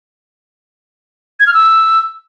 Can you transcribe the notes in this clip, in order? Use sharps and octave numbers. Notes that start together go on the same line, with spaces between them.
G#6
F6
E6